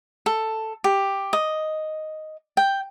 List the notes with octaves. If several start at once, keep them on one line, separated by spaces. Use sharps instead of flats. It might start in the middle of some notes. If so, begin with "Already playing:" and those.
A4
G4
D#5
G5